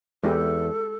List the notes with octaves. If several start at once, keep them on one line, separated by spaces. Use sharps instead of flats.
E2 G#3 E4 G4 A4